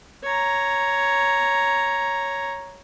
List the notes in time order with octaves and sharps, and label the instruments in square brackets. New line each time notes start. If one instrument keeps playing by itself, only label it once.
[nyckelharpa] C#5 A#5